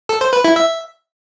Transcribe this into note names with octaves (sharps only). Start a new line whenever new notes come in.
A4
C5
B4
E4
E5